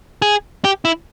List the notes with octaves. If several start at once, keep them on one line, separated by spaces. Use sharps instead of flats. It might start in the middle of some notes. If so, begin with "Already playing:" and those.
G#4
G4
E4